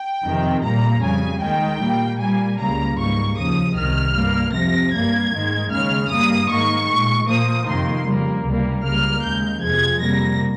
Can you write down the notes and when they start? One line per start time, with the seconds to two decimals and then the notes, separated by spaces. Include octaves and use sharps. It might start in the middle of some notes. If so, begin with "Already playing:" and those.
Already playing: G5
0.25 F2 C3 D#3
0.64 A#2 G3 A#3 A#5
1.03 F2 C#3 G3 G#5
1.42 D#2 D#3 G#3 G5
1.81 A#2 G3 A#3
2.20 A#2 G3 A#3 G#5
2.59 C#2 C#3 G3 A#3 A#5
2.98 G#2 G3 A#3 C#6
3.38 D#2 C#3 F3 D#6
3.77 C2 C3 D#3 F6
4.15 G2 G3 A#3
4.55 F2 C3 F3 A#6
4.94 G2 G3 A#3 G#6
5.33 G#2 D#3 G#3
5.72 D#2 C#3 G#3 F6
6.11 G2 G3 A#3 D#6
6.50 G#2 D#3 A#3 C#6
6.89 A#2 G#3
7.28 A#2 F3 A#3 D#6
7.67 F2 C3 D#3 A#3 C6
8.06 F2 C#3 G3 A#3
8.46 C#2 C3 G3 A#3
8.84 C#2 C#3 G3 A#3 F6
9.24 D#2 C#3 G#3 G6
9.63 F2 C3 F3 G#3 G#6
10.02 F2 C3 G3 A#3 A#6